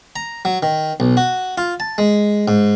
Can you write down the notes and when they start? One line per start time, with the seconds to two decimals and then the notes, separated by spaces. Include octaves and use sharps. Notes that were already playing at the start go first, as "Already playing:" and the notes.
0.16 A#5
0.45 F#3
0.63 D#3
1.00 B1
1.17 F#4
1.58 F4
1.80 A5
1.98 G#3
2.48 G#2